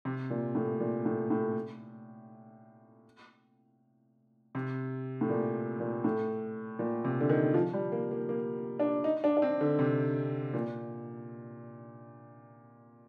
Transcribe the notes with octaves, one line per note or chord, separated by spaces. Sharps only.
C3
A#2
A2
A#2
A2
A2
C3
A2
A#2
A#2
A2
A#2
C3
D3
D#3
F3
G3
A#3
A#3
A#3
D4
D#4
D4
D4
C4
D3
C3
A#2